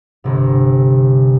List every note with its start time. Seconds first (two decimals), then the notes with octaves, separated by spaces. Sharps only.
0.24 G1 C3